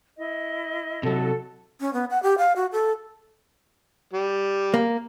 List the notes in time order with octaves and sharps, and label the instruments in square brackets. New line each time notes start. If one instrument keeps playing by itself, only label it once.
[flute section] E4 D#5
[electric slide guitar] C3 F#3 [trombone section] F#4 A4
[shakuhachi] C#4
B3
F#5
G4
F5
F#4
A4
[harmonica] G3
[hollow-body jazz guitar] A#3